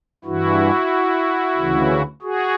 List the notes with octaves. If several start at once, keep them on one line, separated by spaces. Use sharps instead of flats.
G2 E3 E4 F#4
D2 C#3 E3
F#4 G#4